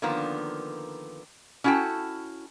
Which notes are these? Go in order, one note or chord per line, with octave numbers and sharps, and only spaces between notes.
D3 D#3 F3 A#3 B3
C#4 E4 F#4 A4 G5 A5